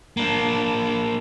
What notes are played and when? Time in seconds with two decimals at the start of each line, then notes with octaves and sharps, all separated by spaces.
0.17 A#3 D4